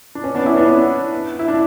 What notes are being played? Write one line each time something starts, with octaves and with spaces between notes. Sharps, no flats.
D4
C#4
B3 D4
C#4 E4
B3 D4
B3
E4
D4